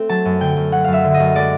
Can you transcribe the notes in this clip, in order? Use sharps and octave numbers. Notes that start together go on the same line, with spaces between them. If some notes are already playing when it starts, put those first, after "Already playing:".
Already playing: A3 C4
F#3 A5
F#2
D3 G5
F#2
F#3 F#5
F#2 F5
E5
D3
D#5
F#2
G#3 D5